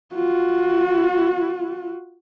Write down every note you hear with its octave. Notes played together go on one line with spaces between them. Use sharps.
F4 F#4